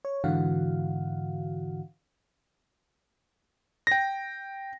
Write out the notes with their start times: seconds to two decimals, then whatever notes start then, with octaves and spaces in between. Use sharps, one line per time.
0.05 C#5
0.24 G#2 D3 E3 F#4 F5 F#5
3.87 G5 A#6